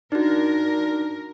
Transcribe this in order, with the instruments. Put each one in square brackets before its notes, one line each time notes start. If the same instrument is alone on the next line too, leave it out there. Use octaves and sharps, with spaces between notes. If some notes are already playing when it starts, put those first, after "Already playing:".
[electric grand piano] D4 [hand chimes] D#4 F#4 [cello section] A#4